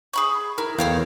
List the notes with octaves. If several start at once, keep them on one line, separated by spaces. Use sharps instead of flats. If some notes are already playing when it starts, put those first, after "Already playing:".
G#4 B5 C#6
E4 A#4
E2 A4 C#5 F5 G5